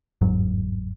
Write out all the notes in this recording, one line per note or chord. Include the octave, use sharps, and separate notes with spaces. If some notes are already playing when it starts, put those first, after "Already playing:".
G1 E2 G#2 F#3